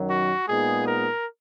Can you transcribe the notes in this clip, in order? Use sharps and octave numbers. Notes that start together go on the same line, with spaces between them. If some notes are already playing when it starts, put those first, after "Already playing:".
Already playing: F#2 D#3 F#3
F#4
A#2 G#3 B3 D#4 G#4
A#4